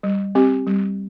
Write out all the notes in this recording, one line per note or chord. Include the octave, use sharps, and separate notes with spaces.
G3
C4 G4
G3